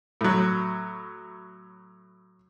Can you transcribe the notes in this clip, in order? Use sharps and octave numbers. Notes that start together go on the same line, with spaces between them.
A2 F#3